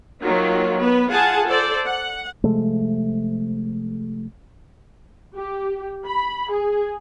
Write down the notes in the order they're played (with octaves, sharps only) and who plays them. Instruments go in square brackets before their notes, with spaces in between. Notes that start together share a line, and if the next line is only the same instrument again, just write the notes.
[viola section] D#3 F#3 A#3 F4
B3 B4
F4 G#4 F#5 G#5 A5
A4 C5 D5
F#5
[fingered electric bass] C3 F3 G#3 A3
[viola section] G4
B5
G#4